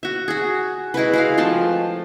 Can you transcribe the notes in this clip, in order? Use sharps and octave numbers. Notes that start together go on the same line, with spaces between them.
F#4 E5
F#4 G#4
G#3 E4 F#4 B4
G#3 F#4 F5
F3 A3 C4 A5